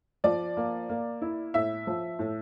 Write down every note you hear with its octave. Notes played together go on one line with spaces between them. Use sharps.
F3 D5
A#3
A#3
E4
A2 E5
F3
A2